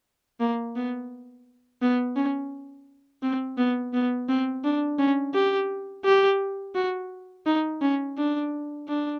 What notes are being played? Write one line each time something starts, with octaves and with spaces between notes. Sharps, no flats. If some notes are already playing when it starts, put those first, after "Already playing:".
A#3
B3
B3
C#4
C4
B3
B3
C4
D4
C#4
G4
G4
F#4
D#4
C#4
D4
D4